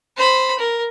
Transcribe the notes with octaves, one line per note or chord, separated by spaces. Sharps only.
C5 B5
A#4